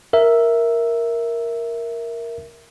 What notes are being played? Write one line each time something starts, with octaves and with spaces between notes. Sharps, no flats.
A#4 E5